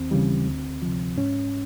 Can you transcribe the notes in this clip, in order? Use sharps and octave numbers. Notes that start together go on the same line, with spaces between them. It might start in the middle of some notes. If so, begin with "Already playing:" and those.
Already playing: D#2 C4
C#3 E3 G3
D2
C3 F3
G#2 C#4